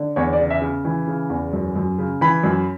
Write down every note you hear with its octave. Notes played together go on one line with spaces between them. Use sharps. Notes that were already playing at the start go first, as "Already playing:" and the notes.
Already playing: D3
E2 C#5
D5
C#3
E5
C#3
E3
C#3
E2
F#2
F#2
C#3
E3 B5
F#2